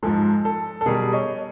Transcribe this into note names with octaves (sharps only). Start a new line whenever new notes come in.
G#2 F3 G#3 A4
A4
A4
B2 G3 G#4 A#4
C#5 D#5